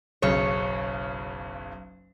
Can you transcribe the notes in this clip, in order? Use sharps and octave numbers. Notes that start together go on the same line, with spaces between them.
F#1 B1 C#3 C#5